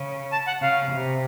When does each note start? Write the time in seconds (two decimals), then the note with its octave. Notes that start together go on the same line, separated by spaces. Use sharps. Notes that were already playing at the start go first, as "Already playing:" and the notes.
Already playing: C#3
0.32 A5
0.47 F#5
0.61 C#3 F5
0.92 C3